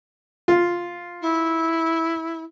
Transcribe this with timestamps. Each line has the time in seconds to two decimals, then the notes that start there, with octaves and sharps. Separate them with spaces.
0.48 F4
1.21 E4